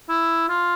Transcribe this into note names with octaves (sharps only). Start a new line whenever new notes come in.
E4
F4